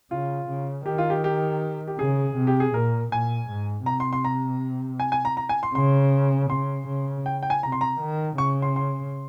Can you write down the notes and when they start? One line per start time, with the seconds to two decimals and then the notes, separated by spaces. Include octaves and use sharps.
0.11 C#3 F4
0.48 C#3
0.86 D#3 G4
0.98 F4
1.10 G4
1.24 G4
1.88 G4
1.99 C#3 G#4
2.37 C3
2.47 G4
2.60 G#4
2.74 A#2 A#4
3.12 A#2 G#5
3.49 G#2
3.86 C3 A#5
4.00 C6
4.13 C6
4.25 A#5
5.00 G#5
5.12 G#5
5.25 A#5
5.37 A#5
5.49 G#5
5.63 C6
5.74 C#3 C6
6.50 C#3 C6
6.88 C#3
7.26 G5
7.43 G5
7.50 G#5
7.63 C3 A#5
7.72 C6
7.81 A#5
8.00 D#3
8.37 C#3 C#6
8.62 C6
8.76 C6